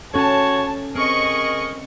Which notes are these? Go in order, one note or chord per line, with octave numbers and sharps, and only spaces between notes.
C#4 F#4 A4 C#5 A5
C4 G#4 A#4 D#5 C#6